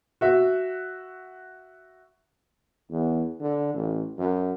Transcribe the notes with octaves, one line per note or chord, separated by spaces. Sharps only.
F#4 E5
E2
D3
A1
F#2